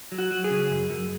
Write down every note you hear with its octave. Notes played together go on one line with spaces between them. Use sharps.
F#3
F#4
F#3
G#4
C#3
F#2
F#2